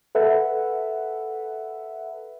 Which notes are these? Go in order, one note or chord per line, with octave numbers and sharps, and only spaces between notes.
A4 B4 E5 F#5